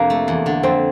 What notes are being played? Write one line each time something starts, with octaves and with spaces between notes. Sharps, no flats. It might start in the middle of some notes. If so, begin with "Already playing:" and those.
Already playing: F2 C3 A#3 D4
A3
E2
D3
F2 C4